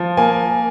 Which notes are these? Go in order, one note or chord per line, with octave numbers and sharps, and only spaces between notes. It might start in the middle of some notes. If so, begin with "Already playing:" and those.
Already playing: F3
A#3 G#5